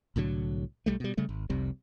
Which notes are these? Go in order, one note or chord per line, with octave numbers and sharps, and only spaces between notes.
C2 A2 D3 F#3
B1 G3 A3
B2 G3
C#3 G3 A3
G#1
F1 C2 C3 G3